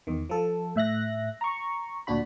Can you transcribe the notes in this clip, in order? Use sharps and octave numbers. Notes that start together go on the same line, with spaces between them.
E2 D#3
F3 A4
A2 E5 F#6 A#6
A#5 C#6
D2 A#2 D4 F#4 B5